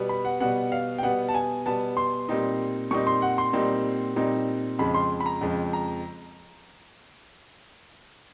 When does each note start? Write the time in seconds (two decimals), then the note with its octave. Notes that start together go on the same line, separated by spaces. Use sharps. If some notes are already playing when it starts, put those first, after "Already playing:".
Already playing: B2 G3 B3
0.09 B5
0.25 F#5
0.40 B2 G3 B3 F#5
0.72 F5
0.98 G5
1.03 B2 G3 B3 F#5
1.28 A5
1.34 G#5
1.66 B2 G3 B3 A5
1.97 C6
2.29 A#2 G3 C4 D#4
2.91 A#2 G3 C4 D#4 C#6
3.07 C6
3.22 F#5
3.38 C6
3.53 A#2 G3 C4 D#4
4.16 A#2 G3 C4 D#4
4.79 F2 C#3 F3 G#3 B5
4.94 C6
5.20 B5
5.26 A#5
5.41 F2 C#3 F3 G#3
5.73 A#5